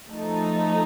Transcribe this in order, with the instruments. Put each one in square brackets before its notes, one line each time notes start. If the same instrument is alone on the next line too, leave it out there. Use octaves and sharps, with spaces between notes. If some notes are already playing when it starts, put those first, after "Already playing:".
[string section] F3 A3 D#4 A4